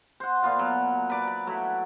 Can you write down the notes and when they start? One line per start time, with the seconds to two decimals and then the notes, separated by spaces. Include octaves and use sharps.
0.20 C5 F#5
0.43 A#2 B3 F4 F5
0.59 F#3
1.10 B4 D5
1.28 B5
1.47 F#3 A3 E4 F#4